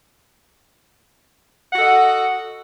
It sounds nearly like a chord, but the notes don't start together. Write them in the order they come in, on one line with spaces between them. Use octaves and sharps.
F#5 F#4 A4 D#5